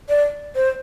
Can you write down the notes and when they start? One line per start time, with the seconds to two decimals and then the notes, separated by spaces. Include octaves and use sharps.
0.09 D5
0.55 C5